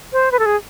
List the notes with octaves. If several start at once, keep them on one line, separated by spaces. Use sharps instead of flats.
C5
B4
A4
G#4